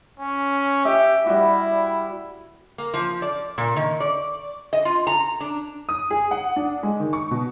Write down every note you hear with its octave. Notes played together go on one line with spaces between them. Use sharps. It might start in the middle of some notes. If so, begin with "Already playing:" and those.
C#4
G4 E5
G3 E4 F#4
A#3
F3
D5
A#2
D#3
D5
D#5
F4
A#5
D4
D#6
G#4
F#5
D4
G#3
D#3
C#6
B2